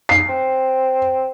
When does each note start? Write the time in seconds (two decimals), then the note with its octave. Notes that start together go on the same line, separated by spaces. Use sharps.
0.09 C7
0.29 C4